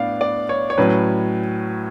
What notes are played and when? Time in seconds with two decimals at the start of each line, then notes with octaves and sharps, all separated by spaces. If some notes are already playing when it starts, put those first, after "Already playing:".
Already playing: A2 B3 D4 D5 F5
0.21 D5
0.49 C#5
0.70 C#5
0.78 A2 F#3 C#4 B4